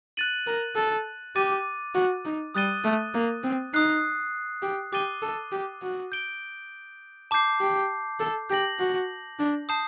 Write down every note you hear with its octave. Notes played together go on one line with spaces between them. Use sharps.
F#6 A6 D#7 F#7
A#4
A4
G4 D6 A6 D#7
F#4
D#4
G3 D#6 F#6 A6 D#7 G7
A3
A#3
C4
D#4 D#6 F#6 C7
G4
G4 D6 A6 D#7 G7
A4
G4
F#4
G6 D7 G7
A5 D6 G6 C7
G4
A4
G4 G6 A#6 F#7
F#4
D4
A5 D#6 G6 C7